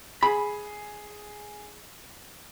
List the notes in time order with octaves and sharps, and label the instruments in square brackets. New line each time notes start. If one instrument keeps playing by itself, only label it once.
[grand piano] G#4 [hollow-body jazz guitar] B5